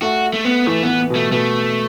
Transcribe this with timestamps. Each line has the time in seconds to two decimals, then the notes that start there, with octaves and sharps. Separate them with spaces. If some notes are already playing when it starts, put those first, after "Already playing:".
0.02 A3 F#4
0.34 A3
0.45 B3
0.66 E3 A3
0.83 B3
0.89 E3
1.10 B2
1.15 A3
1.32 B2 A3